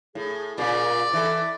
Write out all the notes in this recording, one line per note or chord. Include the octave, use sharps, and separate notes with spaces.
A2 G#4
A#2 C#3 D5
E3 A4 E5